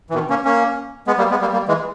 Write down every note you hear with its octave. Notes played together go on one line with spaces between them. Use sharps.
E3
B2 D#3
A#3 C#4
A#3 C#4
G#3 B3
G3 A#3
G#3 B3
G3 A#3
G3 A#3
E3 G#3